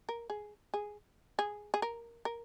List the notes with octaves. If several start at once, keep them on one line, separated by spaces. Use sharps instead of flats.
A#4
G#4
G#4
G#4
G#4
A#4
A#4